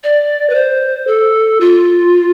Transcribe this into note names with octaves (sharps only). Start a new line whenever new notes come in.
D5
B4
C5
A4
F4